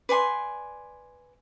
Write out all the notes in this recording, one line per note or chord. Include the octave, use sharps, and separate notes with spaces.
B4 D5 G#5 C6